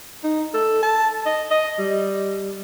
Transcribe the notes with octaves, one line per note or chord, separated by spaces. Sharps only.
D#4
A4
A5
D#5
D#5
G3